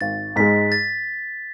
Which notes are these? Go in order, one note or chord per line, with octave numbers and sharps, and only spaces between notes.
G#1 A6
G#2 G#3 B6
A6